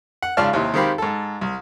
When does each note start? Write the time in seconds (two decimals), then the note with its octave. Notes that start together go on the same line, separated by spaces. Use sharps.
0.22 F#5
0.37 G#2 C#3 F4 D5 A5 F6
0.53 D#2 C3 E4
0.74 D#3 G#3 C4 G4 F5 B5
0.98 G#2 A4
1.41 C2